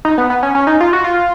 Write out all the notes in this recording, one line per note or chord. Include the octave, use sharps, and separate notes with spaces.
D#4
B3
B3
C#4
C#4
D#4
F4
F#4
F4